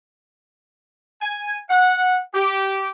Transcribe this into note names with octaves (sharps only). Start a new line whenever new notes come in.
G#5
F#5
G4